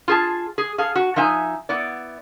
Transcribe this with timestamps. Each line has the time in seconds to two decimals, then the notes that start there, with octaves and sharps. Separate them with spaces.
0.08 F4 G#4 A5
0.58 G#4
0.78 G#4 A4 F5
0.95 F#4
1.16 F3 D#4 E5 G#5
1.69 B3 E4 D5